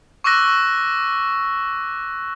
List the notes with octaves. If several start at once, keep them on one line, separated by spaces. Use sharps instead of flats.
C#6 D6 E6 F#6 A#6